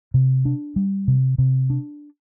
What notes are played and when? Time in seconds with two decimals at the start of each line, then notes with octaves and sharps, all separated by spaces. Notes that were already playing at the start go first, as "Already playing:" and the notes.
0.14 C3
0.45 D4
0.76 G3
1.08 C3
1.38 C3
1.70 D4